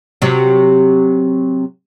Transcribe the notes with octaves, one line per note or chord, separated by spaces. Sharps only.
C3 F#3